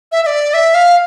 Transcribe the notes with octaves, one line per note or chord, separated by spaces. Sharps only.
E5
E5
D5
E5
F5